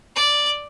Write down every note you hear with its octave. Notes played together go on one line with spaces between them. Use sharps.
D5